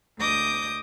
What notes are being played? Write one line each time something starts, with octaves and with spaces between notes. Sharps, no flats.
D2 D#5 D6 D#6 G6